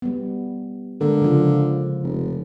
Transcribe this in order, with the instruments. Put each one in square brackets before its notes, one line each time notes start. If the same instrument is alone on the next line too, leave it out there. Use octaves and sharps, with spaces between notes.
[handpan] G3 B3
[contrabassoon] D3 [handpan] G#3 A#3 A#4
[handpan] C#3 F3 F4
[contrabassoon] F1